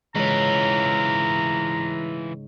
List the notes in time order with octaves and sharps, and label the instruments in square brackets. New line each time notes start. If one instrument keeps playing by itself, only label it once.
[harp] G#2 C#3 [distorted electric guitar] E3 F4 [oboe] A#5